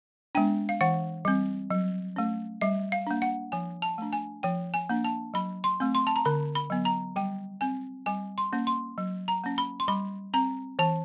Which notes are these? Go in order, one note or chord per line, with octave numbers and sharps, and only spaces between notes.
G#3 B3 D4 G5
F5
E3 F#5
G3 C4
F#3
A3 C#4
G3 E5
F5
A#3 D4
F#5
F3 G#5
A5
A3 D4
G#5
F3 G5
G#5
A#3 D4
A5
F#3 B5
C6
A3 C4
C6
A5
A#5
D3 B5
B5
F#3 B3
A#5
G3 G5
C4 G#5
G3 G#5
C6
A#3 C#4
C6
F#3
A#5
A#3 C#4
B5
C6
G3 B5
C4 A#5
E3 A5